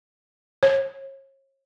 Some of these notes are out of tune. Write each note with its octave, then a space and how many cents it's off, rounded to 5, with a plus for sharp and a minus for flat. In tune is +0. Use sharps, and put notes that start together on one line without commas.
C#5 -40